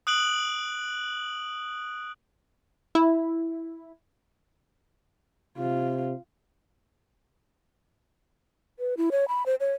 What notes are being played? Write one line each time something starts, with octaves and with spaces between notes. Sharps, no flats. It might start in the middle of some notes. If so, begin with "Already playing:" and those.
D#6 F#6 D7 F#7
E4
C3 F4
B4
E4
C#5
B5
C5
C#5